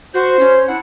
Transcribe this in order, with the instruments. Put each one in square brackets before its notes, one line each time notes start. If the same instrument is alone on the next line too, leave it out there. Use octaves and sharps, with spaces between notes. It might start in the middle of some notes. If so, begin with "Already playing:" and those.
[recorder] F#4 [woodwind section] C5
[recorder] C#4
[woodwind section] D4 E4 F#5